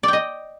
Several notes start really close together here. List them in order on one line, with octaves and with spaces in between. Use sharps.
D5 G5 D#5